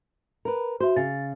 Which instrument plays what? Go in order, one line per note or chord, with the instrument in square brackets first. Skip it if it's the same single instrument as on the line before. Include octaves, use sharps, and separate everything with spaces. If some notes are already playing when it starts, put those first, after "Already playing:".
[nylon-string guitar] A#4 B4
[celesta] F#4 E5 [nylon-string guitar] C5
[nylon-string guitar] C#3 [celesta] A6